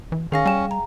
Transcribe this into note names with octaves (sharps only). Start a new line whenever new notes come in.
E3
D#3 C#4 G#4 F5 A#6
G3 G5 G#5 E7
A#5